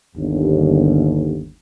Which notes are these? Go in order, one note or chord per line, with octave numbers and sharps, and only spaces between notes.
G1 D#2